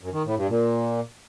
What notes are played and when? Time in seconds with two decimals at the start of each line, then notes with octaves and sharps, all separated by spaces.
0.01 F#2
0.13 D#3
0.25 A2
0.37 G2
0.49 A#2